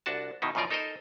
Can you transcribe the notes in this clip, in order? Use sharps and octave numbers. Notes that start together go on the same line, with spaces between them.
C2 D4 F#4 A5
B2 D#3 D#4 E4
F#2 B2 F3 F4 A#4 D5
D#4 A4 A#4 C5 D#5